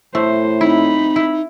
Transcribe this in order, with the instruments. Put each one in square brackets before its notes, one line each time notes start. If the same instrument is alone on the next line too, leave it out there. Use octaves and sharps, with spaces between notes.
[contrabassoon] A2 [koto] A3 [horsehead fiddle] C5
[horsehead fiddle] C4 B5 [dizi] D#4 [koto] E4
[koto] E4